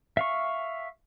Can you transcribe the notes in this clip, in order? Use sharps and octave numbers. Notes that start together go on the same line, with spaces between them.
E5 F5 C#6